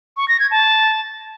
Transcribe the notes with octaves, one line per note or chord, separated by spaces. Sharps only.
C#6
A#6
G#6
A5